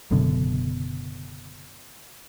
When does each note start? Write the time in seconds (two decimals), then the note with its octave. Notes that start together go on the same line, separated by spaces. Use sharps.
0.11 F#1 F#2 B2 D3